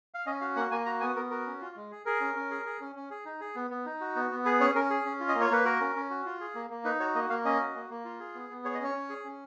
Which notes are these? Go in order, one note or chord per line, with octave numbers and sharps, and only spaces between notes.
F5
C#4 D#5
F#4 F5
A#3 F#5
A#3 G#5
F#4 A#5
B3 G#5
B3 A#4
F#4 A#4
C#4
F4
G#3
G#4
G#4 A#4
C#4
C#4
G#4
G#4
C#4
C#4
G#4
D#4
G#4
B3
B3
D#4
F#4
B3
B3
G#4 B4
C#4 C#5
C#4 A#4
G#4
C#4
F4
D#5
A#3
C#5
A#3 B4
F#4 A#4
C#4
C#4
F#4
F4
G#4
A#3
A#3
D#4 B4
F#4 C#5
A#3 D#5
A#3 F5
C#4 D#5
F#4
A#3
A#3
F4
G#4
B3
B3
G#4 C#5
D#5
C#4 C#5
C#4
G#4
C#4